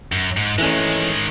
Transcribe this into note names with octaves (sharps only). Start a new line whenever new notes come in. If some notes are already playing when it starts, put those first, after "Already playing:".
F#2
G#2
D#3 E3 G#3 A3 C#4